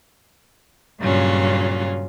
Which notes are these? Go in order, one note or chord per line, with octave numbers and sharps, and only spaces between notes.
G2 A#2 C#3 F#3 C#4 F4